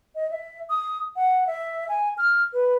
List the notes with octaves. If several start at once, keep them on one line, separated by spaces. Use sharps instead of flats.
D#5
E5
D#6
F#5
E5
G#5
F6
B4